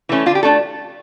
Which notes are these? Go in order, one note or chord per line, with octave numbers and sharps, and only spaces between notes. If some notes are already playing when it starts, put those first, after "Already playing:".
E3 A3 C#4
D3 F4
G4
A3 D4 A4